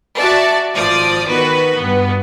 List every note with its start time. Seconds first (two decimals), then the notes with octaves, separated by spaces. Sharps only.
0.18 F#4 D5 E5 A5
0.74 G#1 F3 D5 D#6
1.27 D#3 B3 F#4 B4
1.75 G2 B3